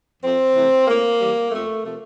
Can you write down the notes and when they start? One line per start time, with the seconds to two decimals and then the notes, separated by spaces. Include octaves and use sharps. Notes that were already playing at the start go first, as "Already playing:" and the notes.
0.23 F2 C4
0.55 C3 E3 A3
0.87 A2 A#3
1.19 E3 G3
1.52 F2 A3
1.84 C3 F3 A3